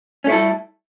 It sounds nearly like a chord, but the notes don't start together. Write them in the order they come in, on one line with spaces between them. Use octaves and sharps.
C#4 A3 E4 A4 G3